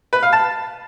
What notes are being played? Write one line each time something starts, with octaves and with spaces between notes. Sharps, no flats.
B4
F5
A5